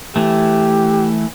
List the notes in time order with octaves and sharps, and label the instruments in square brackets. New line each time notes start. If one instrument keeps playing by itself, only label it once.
[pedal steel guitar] E3 A3 [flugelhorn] G4